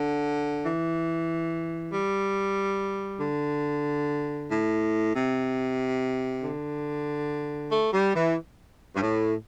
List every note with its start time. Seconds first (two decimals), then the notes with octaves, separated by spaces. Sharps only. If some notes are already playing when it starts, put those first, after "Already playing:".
Already playing: D3
0.63 E3
1.92 G3
3.21 D3
4.49 A2
5.14 C3
6.43 D3
7.72 A3
7.93 G3
8.15 E3
8.96 G2
9.01 A2